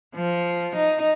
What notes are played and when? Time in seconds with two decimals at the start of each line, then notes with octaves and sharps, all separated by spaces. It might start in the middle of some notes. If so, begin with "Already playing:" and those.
0.15 F3
0.75 D#4